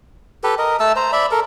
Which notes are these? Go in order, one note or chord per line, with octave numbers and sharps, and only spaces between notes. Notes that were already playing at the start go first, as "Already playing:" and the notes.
G4 A4 B4
A#4 D#5
A3 A5 E6
C5 A#5
D5 E5 B5
A4 A#4